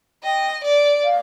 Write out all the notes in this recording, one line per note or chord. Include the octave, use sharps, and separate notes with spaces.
D#5 G5
D5
F5